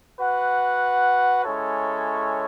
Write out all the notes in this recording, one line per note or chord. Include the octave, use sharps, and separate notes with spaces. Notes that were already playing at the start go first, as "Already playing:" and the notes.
F#4 B4 F#5
G#3 C#4 E4 A4 C#5